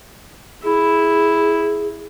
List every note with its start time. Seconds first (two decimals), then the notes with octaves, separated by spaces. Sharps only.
0.64 E4 G#4